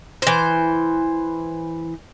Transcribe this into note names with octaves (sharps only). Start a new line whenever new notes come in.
E3 C5